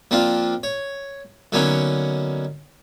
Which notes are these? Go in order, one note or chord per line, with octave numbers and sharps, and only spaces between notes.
F3 A#3 C4 D4 F4
C#5
D3 F#3 A#3 B3 C#4 D#4